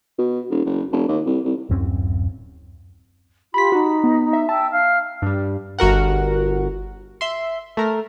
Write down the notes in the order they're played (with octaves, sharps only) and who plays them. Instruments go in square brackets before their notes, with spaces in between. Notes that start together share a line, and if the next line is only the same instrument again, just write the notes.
[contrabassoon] B2
E1
F#1
F1
D#2
C2
C2
[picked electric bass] D1 F#2 C4 C#4
[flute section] F4 G4 C6 [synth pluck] B5 B6
[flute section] D#4 [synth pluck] F#4
[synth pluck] B3
E5
[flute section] E5 G5 E6 [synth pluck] A5
[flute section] F5 F6
[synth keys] G2 G3
G1 F#4 A#4 F#5
E5 C6
A3 A#4